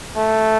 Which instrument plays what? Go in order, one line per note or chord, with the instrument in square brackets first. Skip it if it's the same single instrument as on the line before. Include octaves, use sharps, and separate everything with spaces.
[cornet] A3